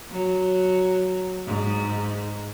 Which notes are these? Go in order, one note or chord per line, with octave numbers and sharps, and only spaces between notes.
F#3
G#2